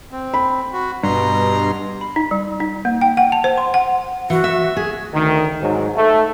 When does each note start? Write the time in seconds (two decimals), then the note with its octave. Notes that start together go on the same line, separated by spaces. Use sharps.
0.12 C4
0.34 B5
0.73 F#4
1.03 G2 B2 A#5 C6
2.01 B5
2.16 D#4
2.31 G3
2.60 D#4
2.85 A#3
3.01 G5
3.17 F#5
3.32 A5
3.44 C5
3.58 C6
3.74 F#5
4.30 E3 F#4
4.44 E5
4.77 G#4
5.14 D2 D#3
5.61 G#2 F#3
5.96 A3